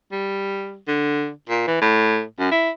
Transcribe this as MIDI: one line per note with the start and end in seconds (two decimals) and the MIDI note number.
0.12 0.78 55
0.87 1.29 50
1.50 1.66 46
1.67 1.80 52
1.82 2.23 45
2.39 2.50 42
2.52 2.70 64